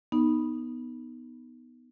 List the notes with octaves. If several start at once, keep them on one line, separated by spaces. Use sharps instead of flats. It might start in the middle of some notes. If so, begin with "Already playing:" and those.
B3 D#4